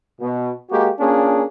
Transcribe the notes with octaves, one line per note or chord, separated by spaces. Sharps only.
B2
G#3 A#3 F#4 G4
A#3 C#4 D4 F4 G#4